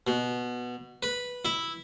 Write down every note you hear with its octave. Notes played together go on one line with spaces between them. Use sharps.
B2
B4
E4